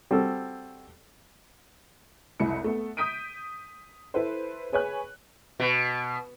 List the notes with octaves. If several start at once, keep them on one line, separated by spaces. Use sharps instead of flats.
G3 C4 F#4 A4
F1 C2 E4 C#7
A3 B3
D#6 G6 B6 D7 D#7
E4 A4 B4 C5
G#4 B4 C#5 G#5 F#6
B2